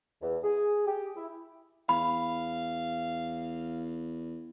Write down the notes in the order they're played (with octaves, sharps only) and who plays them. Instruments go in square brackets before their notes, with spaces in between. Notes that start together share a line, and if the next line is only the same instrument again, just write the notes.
[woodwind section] E2
G#4
G4
E4
[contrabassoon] E2 [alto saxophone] F5 [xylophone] B5